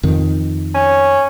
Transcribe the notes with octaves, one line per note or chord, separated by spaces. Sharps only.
F2 D#3
C#4